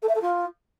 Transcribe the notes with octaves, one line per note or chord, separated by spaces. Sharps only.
A4
E5
A4
F4